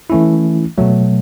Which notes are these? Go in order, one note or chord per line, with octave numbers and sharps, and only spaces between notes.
E3 A3 C#4 E4
B2 F#3 A3